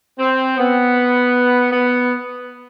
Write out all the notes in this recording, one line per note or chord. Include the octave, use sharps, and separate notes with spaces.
C4
B3
B3